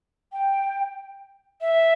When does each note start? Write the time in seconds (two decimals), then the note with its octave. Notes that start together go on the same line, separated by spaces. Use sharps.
0.32 G5
1.61 E5